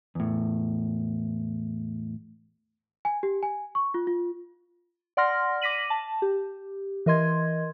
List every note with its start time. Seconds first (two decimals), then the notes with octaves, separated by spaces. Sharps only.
0.15 E2 A2
3.05 G#5
3.23 G4
3.43 G#5
3.75 C#6
3.94 F4
4.07 F4
5.17 D5 F#5 C6 F6 A#6
5.61 D6 A#6 B6 D#7 F#7
5.90 A5
6.22 G4
7.06 E3 A#4 D#5 C6 G#6